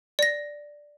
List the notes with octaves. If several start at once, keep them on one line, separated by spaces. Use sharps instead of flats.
D5 A#6